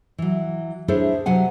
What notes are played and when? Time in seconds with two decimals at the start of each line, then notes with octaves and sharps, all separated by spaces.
0.18 E3 F#3
0.88 D4 E4 G#4 A4 C5 C#5
1.26 C3 F#3 F#5 G#5